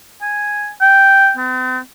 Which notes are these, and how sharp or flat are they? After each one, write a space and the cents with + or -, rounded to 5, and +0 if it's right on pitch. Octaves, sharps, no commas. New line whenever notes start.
G#5 +0
G5 -5
C4 -45